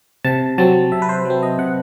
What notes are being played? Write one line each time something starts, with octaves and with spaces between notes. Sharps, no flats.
C3 A5
F#3 C4 A5
C3 E5
B4
C5
F#3
C4
D#5
C3 F#5